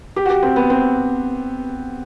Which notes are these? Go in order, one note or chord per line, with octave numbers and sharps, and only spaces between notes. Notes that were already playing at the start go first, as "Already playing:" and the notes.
G4
F#4
G4
C4
B3
C4